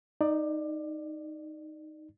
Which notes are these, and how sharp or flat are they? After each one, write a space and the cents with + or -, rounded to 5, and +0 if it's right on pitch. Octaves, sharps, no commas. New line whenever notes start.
D#4 +0 D5 +20